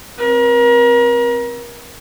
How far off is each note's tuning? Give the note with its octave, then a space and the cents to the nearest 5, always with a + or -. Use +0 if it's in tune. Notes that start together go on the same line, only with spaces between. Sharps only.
C4 +10 A#4 +35